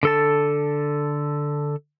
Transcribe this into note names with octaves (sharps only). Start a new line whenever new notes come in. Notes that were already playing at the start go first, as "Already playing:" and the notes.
D3 A4 A5